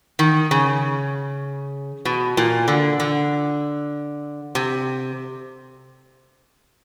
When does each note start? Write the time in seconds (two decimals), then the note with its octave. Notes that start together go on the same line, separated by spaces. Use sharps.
0.19 D#3
0.51 C#3
2.05 B2
2.37 A#2
2.68 D3
3.00 D3
4.55 C3